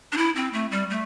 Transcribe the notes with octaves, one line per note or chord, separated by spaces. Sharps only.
D4
E4
C4
A3
G3
A3